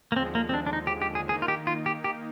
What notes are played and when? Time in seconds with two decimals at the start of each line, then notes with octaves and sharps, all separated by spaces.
0.12 A#3
0.16 D#2 D3 F3 G#3 C4
0.35 A#3
0.49 C4
0.54 D4
0.67 D4
0.73 D#4
0.87 G4
1.02 G4
1.15 G#4
1.29 D#3 A#3 D#4 G#4
1.42 F4
1.48 G4
1.67 F4
1.86 G4
2.04 G4